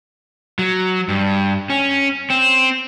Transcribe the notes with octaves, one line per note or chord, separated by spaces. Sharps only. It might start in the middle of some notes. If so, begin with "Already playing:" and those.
F#3
G2
C#4
C4